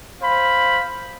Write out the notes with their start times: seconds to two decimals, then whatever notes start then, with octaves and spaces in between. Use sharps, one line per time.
0.23 C5 F5 B5